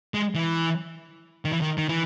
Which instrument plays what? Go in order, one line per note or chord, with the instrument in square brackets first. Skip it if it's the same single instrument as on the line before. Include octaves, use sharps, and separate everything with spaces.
[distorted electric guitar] G#3
E3
D#3
E3
D#3
D#3
E3